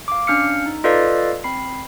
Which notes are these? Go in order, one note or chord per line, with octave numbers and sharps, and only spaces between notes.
F5 D6
C#4 D4 F5 F6 C7 C#7
D#4
F4 A4 B4 D5 D#5 F5
C4 B5 C7